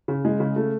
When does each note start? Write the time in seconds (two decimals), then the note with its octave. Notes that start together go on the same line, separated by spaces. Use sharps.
0.08 C#3
0.25 G#3
0.40 C#3
0.56 A3